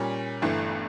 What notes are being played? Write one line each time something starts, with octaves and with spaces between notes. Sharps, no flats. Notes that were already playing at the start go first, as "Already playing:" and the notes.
Already playing: A#2 G3 C#4
G1 G2 E3 A3